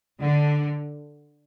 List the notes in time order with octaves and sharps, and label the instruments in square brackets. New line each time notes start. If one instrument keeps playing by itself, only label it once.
[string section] D3